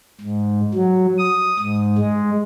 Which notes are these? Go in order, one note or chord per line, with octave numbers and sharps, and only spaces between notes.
G#2
F#3
D#6
G#2
G#3